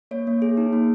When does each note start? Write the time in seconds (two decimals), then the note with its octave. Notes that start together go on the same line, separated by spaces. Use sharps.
0.11 A#3 C#5
0.27 A#3
0.42 G#4
0.57 D#4
0.73 A#3